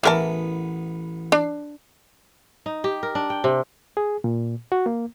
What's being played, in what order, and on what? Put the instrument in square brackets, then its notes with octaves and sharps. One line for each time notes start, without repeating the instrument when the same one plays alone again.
[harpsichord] A1 B3 [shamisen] E3 A#4 A5
[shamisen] D4
[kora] D#4
G4
A#4
D4
G5
C3
[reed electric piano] G#4
A#2
F#4
A#3